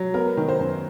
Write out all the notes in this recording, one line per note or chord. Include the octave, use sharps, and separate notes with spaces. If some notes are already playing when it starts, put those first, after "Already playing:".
Already playing: F#3
B3 A#4
D#3
C5
F#2